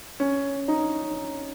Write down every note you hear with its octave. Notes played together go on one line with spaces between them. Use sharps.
C#4
D#4